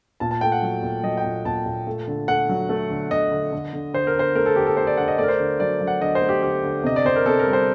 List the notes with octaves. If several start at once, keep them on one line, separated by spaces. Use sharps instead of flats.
A#2 A5
A5
A3 G5
F#5
F#3
A#2
F#3 D#5
G5
A#2
A#2 A5
A#2
A3
D3
A3 F#5
F#3
A3
D3
D3 D#5
D3
D3
D3
D3 C5
A#4
D3 C5
A3 A#4
A4
D3 G4
A4
A3 C5
D5
D3 F#5
D#5
A3 D5
A#4
C5
D3
F#3 D5
F#3
F#5
D3 D#5
C5
A3
G4
D3 G4
D3
C3 D#5
D5
C3 C5
A#4
C3 A4
A#4
G3
C5